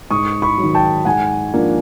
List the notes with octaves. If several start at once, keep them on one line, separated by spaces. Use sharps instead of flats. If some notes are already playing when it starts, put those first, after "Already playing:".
G#2 C#6 D#6
B5 C#6
F#3
D#3
G5 A5
G#2 F#5 G#5
F3 A#3 D4